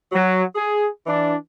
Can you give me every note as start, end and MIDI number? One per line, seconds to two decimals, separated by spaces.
0.12 0.42 54
0.55 0.87 68
1.07 1.35 52
1.07 1.35 62